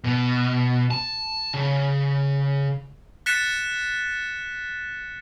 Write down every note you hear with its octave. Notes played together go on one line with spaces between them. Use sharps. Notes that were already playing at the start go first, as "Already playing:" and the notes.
B2
A5
C#3
F#6 A6 B6 C#7 E7